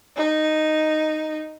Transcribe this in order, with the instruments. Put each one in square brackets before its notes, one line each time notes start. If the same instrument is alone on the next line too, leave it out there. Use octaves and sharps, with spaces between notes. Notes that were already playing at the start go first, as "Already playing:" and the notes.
[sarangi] D#4